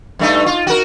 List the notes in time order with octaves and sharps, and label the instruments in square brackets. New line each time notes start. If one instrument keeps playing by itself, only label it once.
[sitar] G2 A3 D#4
F4
F#4 A#4